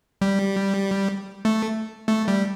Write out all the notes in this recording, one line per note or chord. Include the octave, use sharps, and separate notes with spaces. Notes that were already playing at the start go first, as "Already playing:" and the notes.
G3
A3
A3
G3